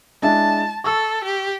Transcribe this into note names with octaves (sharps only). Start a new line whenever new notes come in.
G#3 D4 E4 A5
A4 C#6 E6
G4